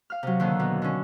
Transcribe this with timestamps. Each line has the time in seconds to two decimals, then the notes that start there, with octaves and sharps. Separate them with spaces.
0.10 F5 F6
0.23 C3 F#3
0.40 D#2 D3 D#3
0.59 B2
0.82 D3 C#4